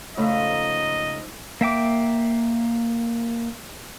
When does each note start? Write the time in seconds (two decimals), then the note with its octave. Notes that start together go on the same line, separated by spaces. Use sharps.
0.17 G#2 C#3 F3 A3 D#5 E5 A#5
1.61 A#3 E5 G5 D6